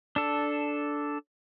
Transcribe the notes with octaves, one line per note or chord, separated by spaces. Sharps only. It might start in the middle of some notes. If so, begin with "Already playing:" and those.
D4 A4